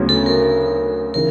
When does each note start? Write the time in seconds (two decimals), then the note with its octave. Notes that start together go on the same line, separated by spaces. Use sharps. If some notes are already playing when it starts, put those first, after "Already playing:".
Already playing: D2 C#3 F#3 B3
0.09 A4
0.26 A#4
1.14 C#3 E3 A#4